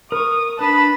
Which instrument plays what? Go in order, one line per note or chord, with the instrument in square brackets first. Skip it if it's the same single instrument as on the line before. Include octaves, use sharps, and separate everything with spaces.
[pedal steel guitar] A#4 C#6 [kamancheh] D#6
[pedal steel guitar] D4 B4 [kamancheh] A5 B5